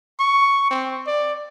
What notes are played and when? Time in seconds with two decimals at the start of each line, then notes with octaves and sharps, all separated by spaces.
0.19 C#6
0.71 C4
1.07 D5